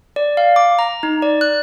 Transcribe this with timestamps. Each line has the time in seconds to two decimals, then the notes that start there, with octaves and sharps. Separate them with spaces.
0.16 D5
0.37 F5
0.56 D6
0.79 A#5
1.03 D#4
1.22 D5
1.41 F#6